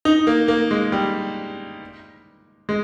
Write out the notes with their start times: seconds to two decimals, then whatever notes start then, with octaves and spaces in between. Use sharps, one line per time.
0.05 D#4
0.27 A#3
0.48 A#3
0.71 G#3
0.92 G3
2.69 G#3